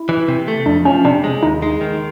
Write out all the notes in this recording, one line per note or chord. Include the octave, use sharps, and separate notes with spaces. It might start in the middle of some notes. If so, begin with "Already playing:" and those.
Already playing: E4
E3
C3
A3
F2 D4
F3 C#4
C3 D4
G#3
D#2 D#4
G#3
D#3